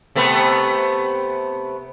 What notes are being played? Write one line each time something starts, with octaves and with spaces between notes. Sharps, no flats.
C3 A3 B3